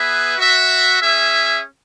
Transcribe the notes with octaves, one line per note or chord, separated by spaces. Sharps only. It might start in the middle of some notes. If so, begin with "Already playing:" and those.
Already playing: B3 G#4 B4 E5
F#4 E5
C#4 G#4 E5